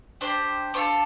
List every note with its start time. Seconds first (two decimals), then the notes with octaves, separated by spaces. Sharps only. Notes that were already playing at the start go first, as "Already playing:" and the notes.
0.21 D4 G4 C5
0.74 D4 F4 A4 C5